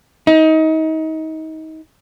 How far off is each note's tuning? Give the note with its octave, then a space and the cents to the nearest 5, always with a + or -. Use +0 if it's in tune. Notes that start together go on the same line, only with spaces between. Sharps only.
D#4 +30